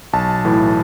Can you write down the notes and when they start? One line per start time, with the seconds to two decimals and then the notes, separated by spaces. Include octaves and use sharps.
0.13 B1 A5
0.45 A2 E3